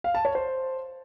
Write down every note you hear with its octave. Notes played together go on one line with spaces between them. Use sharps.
F5
A5
C#5
C5